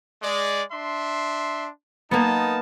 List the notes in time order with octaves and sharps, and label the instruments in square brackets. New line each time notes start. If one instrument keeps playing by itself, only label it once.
[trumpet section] G#3 D5
D4 E5 C6
[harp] A#3 B3 [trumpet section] D#4 A5